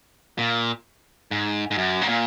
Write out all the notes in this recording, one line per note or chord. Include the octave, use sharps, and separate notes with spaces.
A#2
G#2
G#2
F#2
G#2
A#2